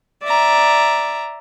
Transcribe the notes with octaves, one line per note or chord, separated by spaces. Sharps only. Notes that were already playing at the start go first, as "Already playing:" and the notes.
D5 E5 A#5